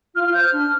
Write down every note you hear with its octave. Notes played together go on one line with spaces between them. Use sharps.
F4 F6
F6
C5 G6
F6
D4